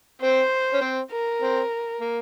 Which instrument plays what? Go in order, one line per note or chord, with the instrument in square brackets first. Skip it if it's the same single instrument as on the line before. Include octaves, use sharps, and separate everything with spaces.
[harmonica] C4 [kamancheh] C5
[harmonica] C#4
C4
[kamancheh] A#4
[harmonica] C4
A#3